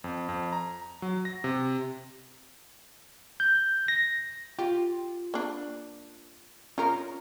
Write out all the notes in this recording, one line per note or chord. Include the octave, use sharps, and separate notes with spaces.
F2
F2
A#5
F#3
A#6
C3
G6
A#6
F4 G4
A#3 D4
C#4 F4 A#4 A#5